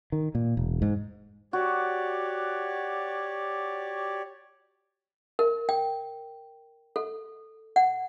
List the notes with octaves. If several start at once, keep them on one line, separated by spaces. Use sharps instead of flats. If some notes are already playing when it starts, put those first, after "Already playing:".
D#3
A#2
E1
G#2
F#4 G4 C#5 D5
A#4
G5
A4
F#5